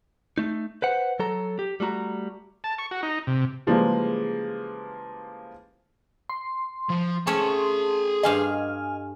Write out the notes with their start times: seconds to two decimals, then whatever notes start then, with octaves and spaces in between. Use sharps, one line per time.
0.38 A3 D#4
0.82 B4 C5 F#5
1.19 F#3 A4 A#5
1.59 G4
1.80 G3 A3 F#4 A#5
2.64 A5
2.78 C#6
2.91 F#4
3.03 D#4
3.27 C3
3.67 C#3 E3 F3 G3 G#3 A#3
6.29 C6
6.89 F3
7.27 A3 C#4 G#4 E5 A5
8.23 G2 D#5 F5 G#5 C6 F6